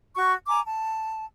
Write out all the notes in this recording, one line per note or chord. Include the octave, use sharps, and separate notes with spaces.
F#4 C#6
G#5 A#5 D6
A5